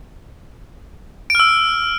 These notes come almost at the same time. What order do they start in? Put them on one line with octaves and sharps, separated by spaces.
D7 F6 E6